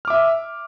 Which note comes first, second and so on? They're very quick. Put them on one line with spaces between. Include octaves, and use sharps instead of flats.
F6 D6 E5